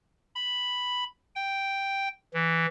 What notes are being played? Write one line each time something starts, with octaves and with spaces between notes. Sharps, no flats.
B5
G5
E3